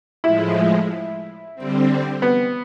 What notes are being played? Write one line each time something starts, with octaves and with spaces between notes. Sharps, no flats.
A2 F3 G#3 E4
D3 G3 C4
B3